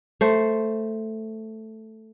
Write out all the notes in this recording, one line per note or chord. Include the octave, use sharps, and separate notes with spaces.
A3 C5